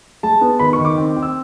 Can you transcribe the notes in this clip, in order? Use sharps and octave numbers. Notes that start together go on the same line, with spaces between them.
G#3 A5
B3
D#3 B5
C#6
D#3
D6
C4
C4
E6